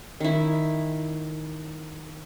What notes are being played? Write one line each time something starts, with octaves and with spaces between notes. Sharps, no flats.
D#3 E4